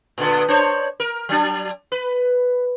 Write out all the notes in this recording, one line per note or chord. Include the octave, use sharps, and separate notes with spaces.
A#2 D3 B3
D4 C5 C#5
A#4
F#3 D4
B4